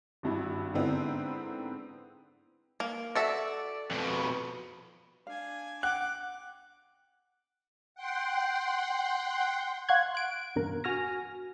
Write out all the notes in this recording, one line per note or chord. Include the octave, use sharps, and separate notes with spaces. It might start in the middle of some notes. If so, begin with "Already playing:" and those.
G#1 G2 E4
G#2 D3 B3 C4 D4 E4
A#3
F#4 A4 D5 E5
F2 B2
D4 F5 G#5
F#5 G5 D6 F#6
F#5 G5 C6
F5 F#5 C6 C#6 F#6 G#6
F#6 D7
E2 G2 B2 A#4
F#4 G#5 F6 A#6